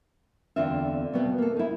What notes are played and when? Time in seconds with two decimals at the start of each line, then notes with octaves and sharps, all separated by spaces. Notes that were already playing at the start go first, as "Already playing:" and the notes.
0.56 E2 D3 C4 D4 F4 E5
1.13 B2 B3 C4
1.38 A#3 A4
1.56 D#4 E4